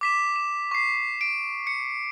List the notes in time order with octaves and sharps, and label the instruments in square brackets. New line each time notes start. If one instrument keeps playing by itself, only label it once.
[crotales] D6 B6 E7
E7
C#6 C7
D7
C#7